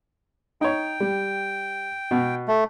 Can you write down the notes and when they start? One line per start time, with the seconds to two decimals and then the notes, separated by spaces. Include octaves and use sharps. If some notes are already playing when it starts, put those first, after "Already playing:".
0.61 D#4 C#5 G5
1.00 G3
2.11 B2
2.48 A3